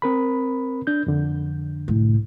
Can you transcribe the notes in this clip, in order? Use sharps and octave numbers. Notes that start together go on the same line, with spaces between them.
C4 A#4 B5
D4 G6
F2 D3
C2 A2